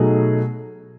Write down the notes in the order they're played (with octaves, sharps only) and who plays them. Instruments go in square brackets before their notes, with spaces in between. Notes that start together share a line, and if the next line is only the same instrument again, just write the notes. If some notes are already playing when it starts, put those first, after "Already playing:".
Already playing: [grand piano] B2 F#3 A3 D#4 G#4